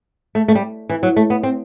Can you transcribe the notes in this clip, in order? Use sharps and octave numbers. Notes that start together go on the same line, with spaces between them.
A3
A3
G3
E3
F#3
A3
B3
C4